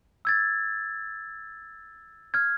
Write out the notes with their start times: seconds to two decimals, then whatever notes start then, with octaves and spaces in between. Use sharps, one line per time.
0.25 E6 G#6 A6
2.34 F6 G#6